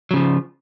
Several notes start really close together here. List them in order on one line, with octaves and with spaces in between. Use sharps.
F#3 C#3 F3